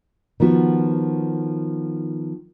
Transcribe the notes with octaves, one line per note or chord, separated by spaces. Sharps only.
D#3 F3 B3 F#4